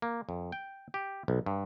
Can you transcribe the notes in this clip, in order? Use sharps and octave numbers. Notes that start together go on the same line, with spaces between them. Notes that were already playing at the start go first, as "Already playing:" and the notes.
A#3
F2
G5
G4
B1
G2